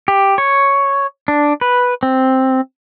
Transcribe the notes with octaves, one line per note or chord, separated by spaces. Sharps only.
G4
C#5
D4
B4
C4